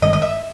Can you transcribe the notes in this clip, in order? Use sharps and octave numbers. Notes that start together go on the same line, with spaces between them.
G1 G2 D#3 G#3 D#5
D#5
E5